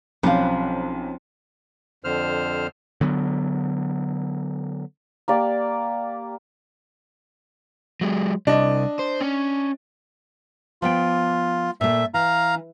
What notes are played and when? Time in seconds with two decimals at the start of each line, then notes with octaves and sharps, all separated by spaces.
0.23 B1 F3 C4 C#4 G4 F5 B5 F#6
2.04 F2 D3 C5 F6
3.01 D3 F#3 B3
5.28 A#3 G4 D5
8.01 F#3 G#3
8.47 C2 D4 D#5
8.99 C5
9.21 C#4
10.82 F3 B3 F4 G5
11.81 A#2 A3 E5
12.14 E3 F5 A#5